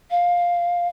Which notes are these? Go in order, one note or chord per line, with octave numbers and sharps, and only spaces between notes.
F5